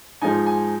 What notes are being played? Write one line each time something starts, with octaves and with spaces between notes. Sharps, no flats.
G#2 F3 G#3 D#4 G#5
G#5